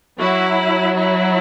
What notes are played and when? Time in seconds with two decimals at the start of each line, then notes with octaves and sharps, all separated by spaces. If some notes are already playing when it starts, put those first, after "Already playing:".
0.19 F#3 E4 F#4
0.98 E4